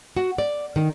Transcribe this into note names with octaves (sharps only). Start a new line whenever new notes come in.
F#4
D5
D#3